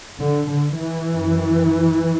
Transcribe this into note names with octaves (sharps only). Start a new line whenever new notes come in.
D3
D3
E3
F#2